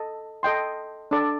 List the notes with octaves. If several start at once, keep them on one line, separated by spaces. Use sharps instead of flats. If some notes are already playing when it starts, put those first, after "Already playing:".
Already playing: A4 D#5
A4 D#5 G5 C6
D4 A4 D5